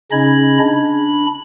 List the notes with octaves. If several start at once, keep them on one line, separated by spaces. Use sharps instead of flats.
C#3 C#4 D#4 D#5 B5 G#6
D4 B5